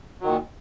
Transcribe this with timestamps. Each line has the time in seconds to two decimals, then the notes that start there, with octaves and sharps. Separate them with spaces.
0.21 F#3
0.24 D#3
0.27 A#2